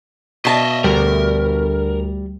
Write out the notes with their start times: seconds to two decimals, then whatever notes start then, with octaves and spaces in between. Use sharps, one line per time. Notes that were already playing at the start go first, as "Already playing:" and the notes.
0.45 B2 D#5 E5 A5
0.84 D2 G3 A#4